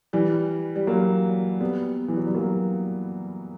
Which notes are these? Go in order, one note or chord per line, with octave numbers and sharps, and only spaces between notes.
E3 G3
G3
F#3 A#3
G3 B3
E3
F#3
G3
F#3 A#3